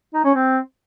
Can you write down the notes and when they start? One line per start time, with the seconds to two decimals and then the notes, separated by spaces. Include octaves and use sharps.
0.14 D#4
0.25 C#4
0.35 C4